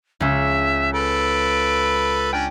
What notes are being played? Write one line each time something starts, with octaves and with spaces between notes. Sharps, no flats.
C#2 C#4 E5
A4 B4 D7
C#4 D4 G5